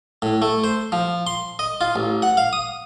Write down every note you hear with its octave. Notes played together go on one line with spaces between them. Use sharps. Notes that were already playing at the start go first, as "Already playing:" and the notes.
A2
A3
C5
F3
C6
D#5
F4
A1
F#5
F5
D#6